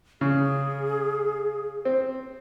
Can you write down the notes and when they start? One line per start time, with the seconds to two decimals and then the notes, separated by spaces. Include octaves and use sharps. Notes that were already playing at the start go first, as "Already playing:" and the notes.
0.21 C#3 G#4
1.85 C4